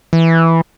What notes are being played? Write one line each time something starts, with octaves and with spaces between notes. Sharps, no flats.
E3